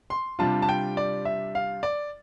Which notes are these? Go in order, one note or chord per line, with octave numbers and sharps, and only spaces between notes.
C6
C3 G3 D4 F4 A5
A5
G5
D5
E5
F5
D5